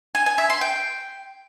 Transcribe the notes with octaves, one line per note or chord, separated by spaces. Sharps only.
G#5
G#5
E5
C6
G5